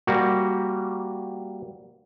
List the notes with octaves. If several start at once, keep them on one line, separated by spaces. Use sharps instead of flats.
G3 A#3 F#4